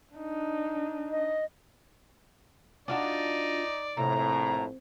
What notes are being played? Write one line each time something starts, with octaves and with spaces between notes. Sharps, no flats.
D4 D#4
D#5
D4 D#4 F4 F#4 D5
A#1 A2 C3 A#5